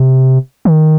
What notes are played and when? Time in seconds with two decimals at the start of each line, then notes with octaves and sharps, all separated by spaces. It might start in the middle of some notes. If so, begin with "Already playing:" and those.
Already playing: C3
0.65 D#3